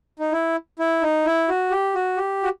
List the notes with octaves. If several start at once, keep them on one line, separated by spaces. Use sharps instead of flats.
D#4
E4
E4
D#4
E4
F#4
G4
F#4
G4
F#4